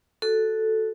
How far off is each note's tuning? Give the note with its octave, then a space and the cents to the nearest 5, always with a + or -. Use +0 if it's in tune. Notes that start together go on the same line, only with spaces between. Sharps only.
F#4 +0 A4 +0